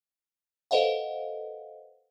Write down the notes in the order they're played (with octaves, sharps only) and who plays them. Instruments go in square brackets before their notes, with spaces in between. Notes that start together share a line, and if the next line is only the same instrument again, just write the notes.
[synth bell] A4 B4 C5 D#5 F5 F#5